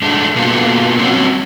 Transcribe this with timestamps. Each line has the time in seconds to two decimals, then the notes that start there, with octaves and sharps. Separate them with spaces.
0.02 G#3 A3 D4
0.36 B2 A#3 B3 F4 F#4 A4
0.98 F#3 G3 A3 C4 C#4 F#4